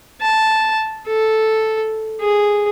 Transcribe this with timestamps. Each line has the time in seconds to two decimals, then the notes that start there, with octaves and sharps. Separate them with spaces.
0.21 A5
1.07 A4
2.21 G#4